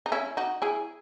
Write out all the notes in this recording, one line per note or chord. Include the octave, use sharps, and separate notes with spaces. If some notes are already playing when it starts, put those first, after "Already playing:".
D#4
C#4 E4
D#4 F#4
E4 G#4